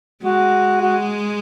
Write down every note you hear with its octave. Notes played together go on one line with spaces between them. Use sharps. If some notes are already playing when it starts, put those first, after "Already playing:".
G#3 F#4
F#4